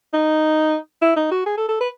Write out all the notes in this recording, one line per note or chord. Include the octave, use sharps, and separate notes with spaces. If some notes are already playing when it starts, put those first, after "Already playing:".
D#4
E4
D#4
F#4
G#4
A4
A4
B4